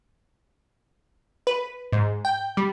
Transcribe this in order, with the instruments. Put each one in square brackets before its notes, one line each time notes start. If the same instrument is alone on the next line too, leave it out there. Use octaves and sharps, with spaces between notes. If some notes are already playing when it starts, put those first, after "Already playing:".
[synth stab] B4
G#2
G5
G3